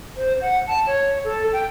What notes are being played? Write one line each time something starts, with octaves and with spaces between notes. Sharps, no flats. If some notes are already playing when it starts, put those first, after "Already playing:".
C5
F#5
A5
C#5
A4
G5